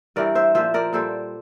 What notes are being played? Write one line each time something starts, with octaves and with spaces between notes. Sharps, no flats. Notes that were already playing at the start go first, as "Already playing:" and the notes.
G2 E3 G3 A#4 D5
C5 E5
A#2 F3 C5 E5
A#4 D5
A#2 G3 A4 C5